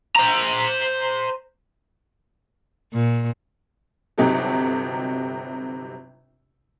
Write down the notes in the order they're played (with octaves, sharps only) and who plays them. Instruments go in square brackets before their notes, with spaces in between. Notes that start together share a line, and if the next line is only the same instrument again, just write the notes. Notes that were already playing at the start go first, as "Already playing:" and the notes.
[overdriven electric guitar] C5 A#5
[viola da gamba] A#2
[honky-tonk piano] G1 C3 F#3 D#4 G4 A4